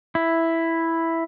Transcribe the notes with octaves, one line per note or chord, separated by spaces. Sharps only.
E4